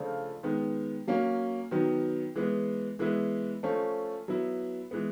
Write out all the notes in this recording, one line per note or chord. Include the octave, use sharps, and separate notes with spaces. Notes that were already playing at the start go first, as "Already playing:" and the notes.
Already playing: C#3 F3 A3 D4 F4
D#3 G#3 B3
F#3 A#3 C#4
D#3 F#3 B3
E3 G#3 B3
E3 G#3 B3 E4
F3 A3 C#4
F#3 B3 E4
E3 G#3 B3